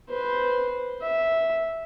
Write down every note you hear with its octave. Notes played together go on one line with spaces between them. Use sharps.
B4 C5
E5